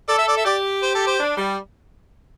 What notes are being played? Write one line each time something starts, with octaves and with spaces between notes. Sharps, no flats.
A4 D5
E5
D5
E5
G4 D5
C5
A4
C5
D4
G3